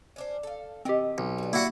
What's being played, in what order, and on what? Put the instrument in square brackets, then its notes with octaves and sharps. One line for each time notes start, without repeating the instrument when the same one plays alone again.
[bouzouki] C#4 D4 C5
A4 F5
[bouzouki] B2 D#3 D#5 [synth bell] C4 G4
[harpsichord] B1
[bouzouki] G3 B4
[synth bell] A#3 [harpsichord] E4 F#4 F#5